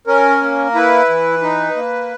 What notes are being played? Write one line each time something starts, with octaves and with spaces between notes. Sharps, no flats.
C#4 A#4
A#3
E4 B4
E3
D#4
A#3